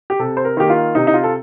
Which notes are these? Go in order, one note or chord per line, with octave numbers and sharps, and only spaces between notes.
G4
C3 A4
C5
A#4
D#3 A#3 G4
F4
C3 D#4
D#4
F4
A4